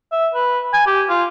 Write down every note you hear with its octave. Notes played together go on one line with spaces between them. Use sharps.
E5
B4
G#5
G4
F4